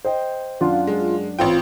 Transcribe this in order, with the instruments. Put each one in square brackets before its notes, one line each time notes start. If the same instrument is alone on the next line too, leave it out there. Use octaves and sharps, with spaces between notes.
[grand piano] C5 D#5 G5
[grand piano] F#2 D4 F#5 [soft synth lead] F4
[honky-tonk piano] G#3
[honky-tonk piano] A1 C4 G5 [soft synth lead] F4